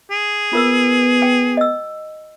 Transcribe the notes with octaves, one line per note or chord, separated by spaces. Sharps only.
G#4
B3 F4 A#4 E6
G5
D#5 E6